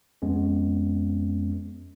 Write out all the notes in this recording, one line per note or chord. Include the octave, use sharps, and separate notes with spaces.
F2 G#3 B3 C#4